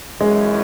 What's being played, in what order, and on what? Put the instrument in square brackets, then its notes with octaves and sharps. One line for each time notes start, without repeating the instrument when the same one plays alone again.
[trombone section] G#1 F#2 E3 C#4 E4 [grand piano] G#3